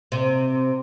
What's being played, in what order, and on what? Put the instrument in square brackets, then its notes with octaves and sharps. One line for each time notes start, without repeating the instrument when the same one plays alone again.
[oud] C3